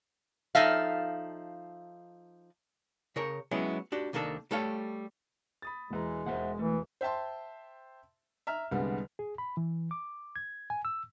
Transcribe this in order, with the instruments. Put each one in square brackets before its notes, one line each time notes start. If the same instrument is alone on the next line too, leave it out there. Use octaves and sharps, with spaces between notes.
[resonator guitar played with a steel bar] F3 D#4 A4 E5 F5
[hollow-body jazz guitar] C#3 A#4 C#5
F#3 G#3 B3 C#4 E4
D4 F#4 G4
C2 D#3 A#3 D4 A4
G3 A3 A4 C#5 F5
[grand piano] B5 D#6 A6
[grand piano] E1 E3 A#5 [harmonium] G#3
[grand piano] E1 A#4 [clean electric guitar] C5 E5 F#5
[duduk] E3 [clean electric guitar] A3
[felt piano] C5 E5 G5 A5 C6
E5 A#5 F6
C2 D3 G3 G#3 B3
[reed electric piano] G#4
B5
E3
D6
G#6
G#5
E6